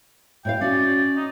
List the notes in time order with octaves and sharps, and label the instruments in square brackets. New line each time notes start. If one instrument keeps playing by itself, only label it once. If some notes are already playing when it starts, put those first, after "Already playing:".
[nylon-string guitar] A2 C#5 F5 [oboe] G5
[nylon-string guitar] C#4 F#4 [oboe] D5
[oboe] D#4